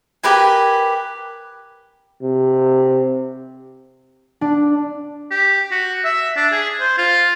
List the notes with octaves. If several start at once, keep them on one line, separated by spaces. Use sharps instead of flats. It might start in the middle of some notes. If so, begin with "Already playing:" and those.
G4 A#4 B4 G#5
C3
D4
G4
F#4
E5
D4
G#4
C5
F4